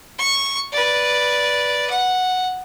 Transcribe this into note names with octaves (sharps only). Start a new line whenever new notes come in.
C#6
B4 D5
F#5